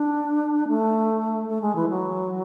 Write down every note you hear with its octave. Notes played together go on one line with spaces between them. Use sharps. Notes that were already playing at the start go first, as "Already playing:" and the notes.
Already playing: D4
A3
A3
G#3
E3
F#3